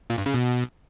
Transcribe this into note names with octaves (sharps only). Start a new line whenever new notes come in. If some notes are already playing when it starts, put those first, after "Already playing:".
A#2
G2
C#3
B2